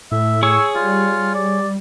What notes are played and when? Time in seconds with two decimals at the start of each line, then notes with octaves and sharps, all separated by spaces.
0.12 A2 E5
0.43 G#4 C#5 C#6 E6
0.75 G3 F4
1.35 D5